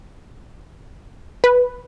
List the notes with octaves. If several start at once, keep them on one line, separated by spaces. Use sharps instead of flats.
B4